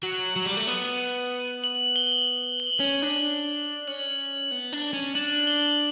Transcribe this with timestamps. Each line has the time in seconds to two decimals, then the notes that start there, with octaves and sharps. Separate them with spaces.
0.03 F#3 F#7
0.36 F#3
0.46 G3
0.57 A3
0.67 B3
1.64 F#7
1.96 G7
2.60 F#7
2.80 C#4
3.02 D4
3.88 C#4 F#7
4.51 B3
4.73 D4
4.93 C#4
5.15 D4 F#7
5.47 G7